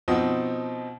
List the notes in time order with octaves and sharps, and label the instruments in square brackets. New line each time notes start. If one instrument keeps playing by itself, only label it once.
[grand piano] B2 F3 C4 D#4